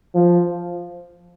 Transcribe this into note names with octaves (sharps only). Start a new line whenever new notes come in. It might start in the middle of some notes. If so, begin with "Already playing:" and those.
F3